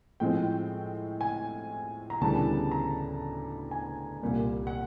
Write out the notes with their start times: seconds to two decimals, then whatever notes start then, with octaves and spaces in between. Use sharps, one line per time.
0.20 A2 F3 G#3 C4 G5
1.21 G#5
2.10 A#5
2.21 D2 C#3 E3 G3 B3 A5
2.71 A#5
3.71 G#5
4.22 C2 A#2 G3 A#3
4.67 F#5